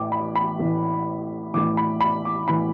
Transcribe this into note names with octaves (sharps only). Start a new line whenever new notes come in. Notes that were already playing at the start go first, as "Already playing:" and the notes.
Already playing: A1 A2 E3 D6
B5
B5
A1 A2 E3
A1 A2 E3 D6
B5
B5
D6
A2 E3 B5